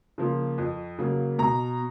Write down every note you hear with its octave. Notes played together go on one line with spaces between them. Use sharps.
C#3 F3 A#3
F2
C#3 F#3 A#3
B2 A#5